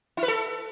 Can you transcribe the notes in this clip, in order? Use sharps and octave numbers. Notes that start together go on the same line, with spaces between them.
E4
B4
A4